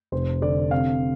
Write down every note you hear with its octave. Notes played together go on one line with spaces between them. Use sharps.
F1 C5
D3 D5
C3 F5